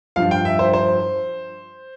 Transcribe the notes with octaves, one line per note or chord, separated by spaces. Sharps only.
G2 F3 F5
G5
E5
C5
C5